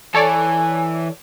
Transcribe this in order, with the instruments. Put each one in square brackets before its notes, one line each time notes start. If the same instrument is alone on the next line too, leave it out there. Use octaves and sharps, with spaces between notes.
[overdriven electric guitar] E3 [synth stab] A4 C#5 D5 [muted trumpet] G#5